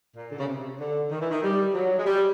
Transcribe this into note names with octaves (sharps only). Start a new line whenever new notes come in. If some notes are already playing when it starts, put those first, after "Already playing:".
A#2
D3
C#3
C3
D3
D#3
E3
D#3
G3
F#3
G#3
G3